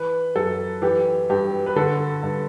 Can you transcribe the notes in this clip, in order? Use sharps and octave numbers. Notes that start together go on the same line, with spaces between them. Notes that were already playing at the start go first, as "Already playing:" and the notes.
Already playing: E3 B4
F#2 A4
E3 G4
G2 G4
B4
D3 A4
G2